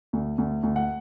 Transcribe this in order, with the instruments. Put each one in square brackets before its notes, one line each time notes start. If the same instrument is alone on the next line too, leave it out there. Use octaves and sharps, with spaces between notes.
[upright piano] D2
D2
D2
F#5